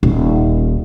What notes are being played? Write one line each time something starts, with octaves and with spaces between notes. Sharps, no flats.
D#1